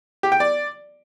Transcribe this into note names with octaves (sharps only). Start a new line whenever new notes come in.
G4
G5
D5